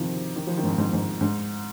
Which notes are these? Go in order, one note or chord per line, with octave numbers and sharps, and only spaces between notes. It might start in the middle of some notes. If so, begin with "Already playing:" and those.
Already playing: C3 D#3 F3
D#3
F3
D#3
G#2
F2
G#2
G#2
G#2